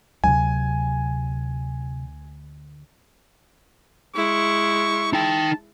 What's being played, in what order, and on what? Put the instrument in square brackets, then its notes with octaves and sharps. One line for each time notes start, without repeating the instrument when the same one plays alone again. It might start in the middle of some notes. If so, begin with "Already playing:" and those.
[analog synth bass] D2 [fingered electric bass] C3 F#3 [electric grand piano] G#5
[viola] G#3 E4 [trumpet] C#6
[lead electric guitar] D#4 G5 [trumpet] A5